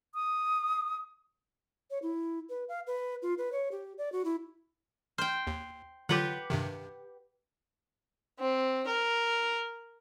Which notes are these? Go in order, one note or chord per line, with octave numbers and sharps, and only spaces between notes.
D#6
C#5
E4
B4
F5
B4
F4
B4
C#5
G4
D5
F#4
E4
C5 G5 F6
D#2
D3 F#3 F4 G4 B4 F#5
G2 C3 D#3
C4
A#4